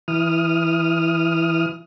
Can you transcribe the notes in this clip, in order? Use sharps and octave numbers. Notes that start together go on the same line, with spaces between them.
E3 D#6 F6